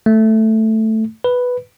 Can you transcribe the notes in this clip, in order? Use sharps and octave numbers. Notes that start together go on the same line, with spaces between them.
A3
B4